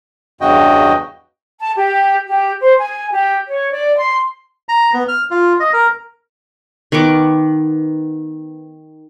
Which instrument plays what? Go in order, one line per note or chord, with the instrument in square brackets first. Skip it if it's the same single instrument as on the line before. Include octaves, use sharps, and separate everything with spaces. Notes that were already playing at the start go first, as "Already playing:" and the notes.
[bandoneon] E2 G2 C#3 F#4 D#5 G5
[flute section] A5
G4
G4
C5
G#5
G4
C#5
D5
C6
[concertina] A#5
B3
F6
F4
D#5
A#4
[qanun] D#3 B3 C#6 D6